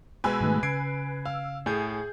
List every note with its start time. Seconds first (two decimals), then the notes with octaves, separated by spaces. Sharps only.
0.24 B2 G#3 B4 G#5 E6
0.41 G#2 D#3 A3
0.63 C#3 G#6 C7 D7
1.25 F5 E6
1.66 A2 G#4 G6